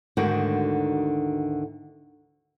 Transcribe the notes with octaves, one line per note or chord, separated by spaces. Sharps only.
D2 G#2 D3 D#3 F#4